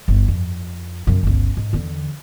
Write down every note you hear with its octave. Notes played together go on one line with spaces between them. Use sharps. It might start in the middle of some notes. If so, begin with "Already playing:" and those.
G1
F2
F#2 C#3
G1 C#2
G#2
E2 D3